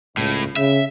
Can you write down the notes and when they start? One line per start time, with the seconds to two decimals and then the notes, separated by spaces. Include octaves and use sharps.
0.17 C#2 A2
0.56 C#3 E5